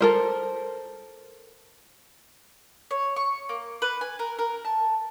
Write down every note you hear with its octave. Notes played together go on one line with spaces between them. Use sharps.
A4 A#4 C5
C#5
C#6
A#3
B4
G#5
A#4
A#4
A5